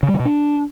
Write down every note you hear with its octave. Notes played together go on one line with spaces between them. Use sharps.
C#3
G3
D3
B2
D4